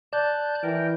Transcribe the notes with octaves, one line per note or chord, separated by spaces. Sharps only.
D5 A5 F#6 G6
E3 A#4 G5